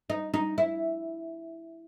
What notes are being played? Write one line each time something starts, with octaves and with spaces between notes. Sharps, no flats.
D#4
D#4
E4